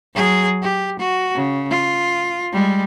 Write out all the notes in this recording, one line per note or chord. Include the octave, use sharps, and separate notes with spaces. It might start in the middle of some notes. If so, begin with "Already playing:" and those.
F#3 G#4
G4
F#4
C#3
F4
G3 G#3